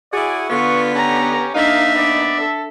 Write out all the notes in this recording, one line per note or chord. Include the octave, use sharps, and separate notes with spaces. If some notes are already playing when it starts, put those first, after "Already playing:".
E4 F#4 G#4 D5
D3 B3 F4 C#6
C#4 G4 A#5
A#3 D4 D#4 E5 F5
B3 D5
A4